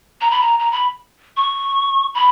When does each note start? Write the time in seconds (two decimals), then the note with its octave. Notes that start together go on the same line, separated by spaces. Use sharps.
0.21 A#5
0.31 B5
0.41 A#5
0.59 A#5
0.72 B5
1.37 C#6
2.15 B5